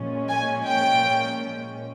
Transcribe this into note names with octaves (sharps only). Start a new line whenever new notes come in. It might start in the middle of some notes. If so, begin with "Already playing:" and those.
Already playing: A#2 F3 G#3 C#4
G#5
G5